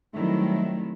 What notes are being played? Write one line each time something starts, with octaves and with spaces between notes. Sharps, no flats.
D#3 F#3 G3 A3 C4 E4